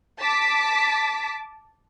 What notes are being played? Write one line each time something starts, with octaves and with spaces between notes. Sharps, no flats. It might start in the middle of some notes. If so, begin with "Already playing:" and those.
A5 D6 B6